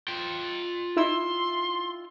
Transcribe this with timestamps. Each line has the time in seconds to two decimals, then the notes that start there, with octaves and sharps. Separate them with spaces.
0.08 F4 G5
0.96 D#4 E4 C6 E6